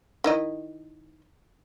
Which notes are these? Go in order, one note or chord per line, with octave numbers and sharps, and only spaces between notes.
D#3 E4 D#5